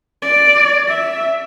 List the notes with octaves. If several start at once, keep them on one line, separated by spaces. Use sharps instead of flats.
D5
E5